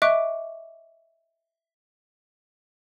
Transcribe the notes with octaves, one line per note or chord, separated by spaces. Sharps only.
D#5 E5 C#6 D6 F#6 D7